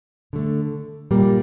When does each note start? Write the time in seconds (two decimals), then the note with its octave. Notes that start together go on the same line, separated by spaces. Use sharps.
0.33 D3 A3
1.11 A#2 G3 A#3